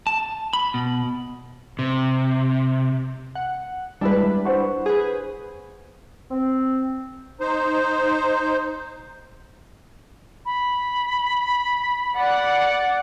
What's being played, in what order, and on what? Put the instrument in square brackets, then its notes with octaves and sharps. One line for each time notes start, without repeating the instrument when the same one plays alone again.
[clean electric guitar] A5
B5
B2
[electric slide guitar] C3
[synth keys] F#5
[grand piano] G3 G#3 [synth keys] D4 E4 B4
[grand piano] G3
C5 F#5 C#6
[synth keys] G#4 B4
[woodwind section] C4
[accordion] D#4 C5
[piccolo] B5
[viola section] D5 F#5